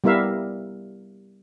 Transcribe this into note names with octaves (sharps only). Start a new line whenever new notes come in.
G3 B3 E4 A#4 E5 F5